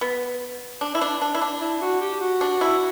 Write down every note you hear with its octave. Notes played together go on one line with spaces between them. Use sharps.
B3
D4
E4
D4
D4
E4
D4
E4
F#4
G4
F#4
D4
E4